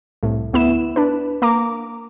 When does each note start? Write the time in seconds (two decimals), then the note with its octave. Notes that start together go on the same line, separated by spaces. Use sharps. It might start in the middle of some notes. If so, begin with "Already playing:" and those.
0.23 C2 A2
0.53 D2 B3 E4 E7
0.96 D4 B4
1.42 A#3 A#5 D6